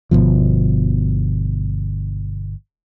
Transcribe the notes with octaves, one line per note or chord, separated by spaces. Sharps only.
G1 C2 B2 F3